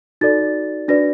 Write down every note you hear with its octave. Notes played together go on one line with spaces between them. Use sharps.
D#4 F#4 A4 D5 A6
D4 F#4 B4 D5 A#6